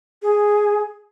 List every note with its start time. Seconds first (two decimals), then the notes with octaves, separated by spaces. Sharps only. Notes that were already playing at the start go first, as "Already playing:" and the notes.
0.22 G#4